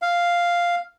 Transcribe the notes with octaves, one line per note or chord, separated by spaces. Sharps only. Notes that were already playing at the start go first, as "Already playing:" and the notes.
F5